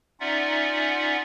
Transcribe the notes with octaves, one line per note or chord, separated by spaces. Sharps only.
C#4 D#4 F4 D5 E5 F#5